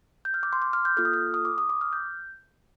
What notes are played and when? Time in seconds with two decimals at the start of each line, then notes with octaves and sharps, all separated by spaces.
0.25 G6
0.34 F6
0.43 D6
0.53 C6
0.62 D6
0.73 F6
0.85 G6
0.97 A#3 F4 A4 F6
1.05 D#6
1.13 F6
1.34 D#6
1.45 D6
1.58 D#6
1.69 D6
1.81 F6
1.93 G6